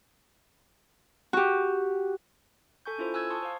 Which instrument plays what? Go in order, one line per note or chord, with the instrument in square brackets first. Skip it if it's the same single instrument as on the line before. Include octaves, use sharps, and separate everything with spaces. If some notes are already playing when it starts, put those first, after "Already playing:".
[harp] F#4 G4
[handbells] A4 G#5 C#6 G6
C#4 E4 F4 A4 C5
G#5 E6 F#6 G#6
A5 C6 C#6 D#6 G#6
C5 F5